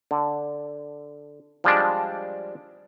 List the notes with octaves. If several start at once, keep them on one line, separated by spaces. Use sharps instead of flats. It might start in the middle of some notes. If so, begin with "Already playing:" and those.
D3
F3 G3 G#3 D4